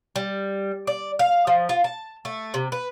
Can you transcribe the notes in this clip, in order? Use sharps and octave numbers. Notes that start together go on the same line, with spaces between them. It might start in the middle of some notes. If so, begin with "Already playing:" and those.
G3
D5
F5
F3
F4
A5
A3
C3
B4